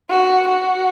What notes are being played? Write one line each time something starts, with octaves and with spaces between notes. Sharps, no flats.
F#4
F#4